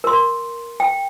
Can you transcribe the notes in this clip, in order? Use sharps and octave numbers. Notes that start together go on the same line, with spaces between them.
A#4 C6
G5